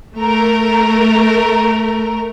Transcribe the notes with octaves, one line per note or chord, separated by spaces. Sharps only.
A3 A#4